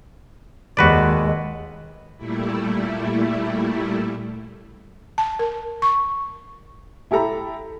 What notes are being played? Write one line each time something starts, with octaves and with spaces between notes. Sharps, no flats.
D#2 G#3 F#4 B4 D5
A#2 G3 A3 E4
A5
A#4
C#6
E4 G4 A4 A#5 B5